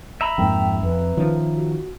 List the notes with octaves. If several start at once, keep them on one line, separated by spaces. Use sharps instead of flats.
E5 A#5 B5
F2 G#2 A#3 G5
F2 B4
D#3 F3 C#4
F#4